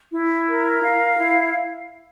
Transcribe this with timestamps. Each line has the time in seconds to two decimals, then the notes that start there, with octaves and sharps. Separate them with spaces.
0.12 E4
0.47 A#4
0.83 F5
1.18 E4